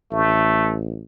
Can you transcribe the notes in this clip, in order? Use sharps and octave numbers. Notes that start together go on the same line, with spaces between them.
A1 A3